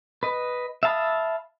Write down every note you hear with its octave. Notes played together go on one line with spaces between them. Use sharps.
B4 D#5
E5 F5 A5 B5 D#6